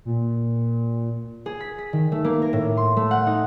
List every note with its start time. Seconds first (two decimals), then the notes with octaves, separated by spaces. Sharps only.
0.05 A#2
1.46 G#4
1.60 B6
1.78 B6
1.93 D#3
2.12 A3
2.24 A#3
2.42 A#4
2.53 A2
2.77 C6
2.97 A3
3.11 F#5
3.26 D#4